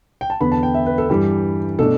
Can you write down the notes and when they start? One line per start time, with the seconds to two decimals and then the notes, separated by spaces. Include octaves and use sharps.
0.21 G5
0.30 A5
0.41 E2 D3 B3 B5
0.52 A5
0.63 G5
0.74 E5
0.86 B4
0.98 A4
1.09 G2 E3 G3 G4
1.79 B2 A3 D4 A4